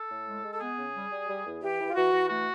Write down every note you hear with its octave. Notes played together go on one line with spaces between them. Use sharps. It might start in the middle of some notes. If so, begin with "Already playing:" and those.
Already playing: A4
A2
G#3
G#3
A4
B3 G#4
C#3
G3
G3
G3
E2
E3 G4
E3
F4
E3 F#4
E3
A3 F#4